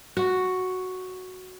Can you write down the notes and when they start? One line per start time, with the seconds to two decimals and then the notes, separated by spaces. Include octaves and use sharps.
0.17 F#4